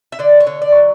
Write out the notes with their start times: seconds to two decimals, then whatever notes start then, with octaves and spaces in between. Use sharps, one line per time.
0.12 E5
0.19 D3 D5
0.40 C#5
0.47 D3
0.62 D5
0.75 F#3